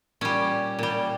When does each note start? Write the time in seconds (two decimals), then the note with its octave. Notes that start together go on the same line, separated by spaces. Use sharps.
0.21 A#2 G3 C#4
0.79 A#2 G3